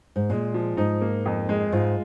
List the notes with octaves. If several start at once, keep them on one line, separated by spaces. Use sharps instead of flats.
G#2
A#2 G#3
F3
G#2 D#4
A#3
F2
G#3
G#2 F4